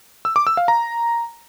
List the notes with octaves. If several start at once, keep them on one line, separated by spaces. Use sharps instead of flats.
E6
D6
E6
F5
A#5